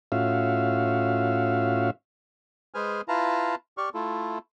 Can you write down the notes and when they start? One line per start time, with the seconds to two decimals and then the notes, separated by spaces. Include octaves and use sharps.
0.12 A2 C#4 F4 F#4 E5 F5
2.74 G#3 G#4 B4 C5 G#5 F6
3.08 E4 F4 B4 F5 A5 A#5
3.78 G4 D5 C#6 F6
3.94 A3 E4 F4 A4